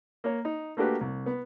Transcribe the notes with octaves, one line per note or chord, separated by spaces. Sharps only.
A#3 C#5
D#4
A3 A#3 D4 F#4 G4 B4
C2
B3